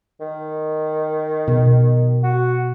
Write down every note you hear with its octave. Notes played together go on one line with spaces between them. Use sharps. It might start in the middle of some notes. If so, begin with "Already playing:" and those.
D#3
B2
F#4